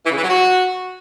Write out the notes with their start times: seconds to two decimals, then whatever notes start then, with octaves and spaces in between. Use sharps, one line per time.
0.05 E3
0.11 C#3
0.17 E3
0.23 F#3
0.29 F#4